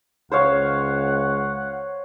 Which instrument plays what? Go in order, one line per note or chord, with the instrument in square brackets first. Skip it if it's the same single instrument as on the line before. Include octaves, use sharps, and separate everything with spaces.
[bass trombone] C#2 [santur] C5 C#5 F5 [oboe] F#5